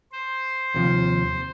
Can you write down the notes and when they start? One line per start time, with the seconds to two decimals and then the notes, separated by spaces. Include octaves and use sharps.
0.12 C5
0.74 D#2 C3 F3